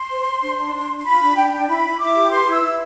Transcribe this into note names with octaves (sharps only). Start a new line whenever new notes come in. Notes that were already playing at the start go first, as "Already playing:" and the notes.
Already playing: C6
C5
C5
D4
D4
D4
D4
C6
F4 B5
D4
D4 G5
D4
E4 B5
E4
E4 D6
G4
B4 C6
E4 E6
E4